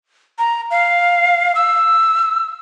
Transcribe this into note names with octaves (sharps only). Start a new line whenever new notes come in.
A#5
F5
E6